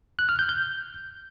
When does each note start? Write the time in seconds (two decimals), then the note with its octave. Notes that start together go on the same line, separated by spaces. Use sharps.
0.19 F#6
0.29 F6
0.39 G6
0.49 G6